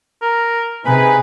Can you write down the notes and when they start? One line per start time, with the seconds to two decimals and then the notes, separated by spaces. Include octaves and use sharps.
0.22 A#4
0.85 C3 D#4 G#4 B4 G#5 B5